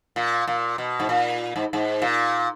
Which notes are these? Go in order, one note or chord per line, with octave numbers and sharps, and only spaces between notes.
A#2
A#2
B2
G#2
A#2
G#2
G#2
A#2